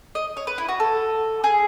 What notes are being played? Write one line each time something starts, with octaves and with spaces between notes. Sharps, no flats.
D#5
C#5
B4
E4
F#4
A4
G#4